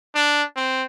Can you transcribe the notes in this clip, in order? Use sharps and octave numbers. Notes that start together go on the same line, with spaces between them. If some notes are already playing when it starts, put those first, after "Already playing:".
D4
C4